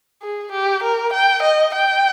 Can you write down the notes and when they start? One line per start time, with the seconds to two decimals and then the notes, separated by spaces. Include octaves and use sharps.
0.22 G#4
0.52 G4
0.83 A#4
1.13 G5
1.43 D#5
1.74 G5